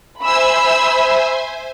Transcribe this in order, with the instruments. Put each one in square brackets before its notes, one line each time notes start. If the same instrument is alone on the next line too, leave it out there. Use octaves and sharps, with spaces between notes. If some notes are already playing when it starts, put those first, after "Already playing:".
[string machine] C5 E5 G#5 [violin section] B5 E6